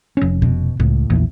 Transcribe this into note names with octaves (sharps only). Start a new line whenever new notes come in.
F1 C#4
B2
C#2 A2
A#1 E2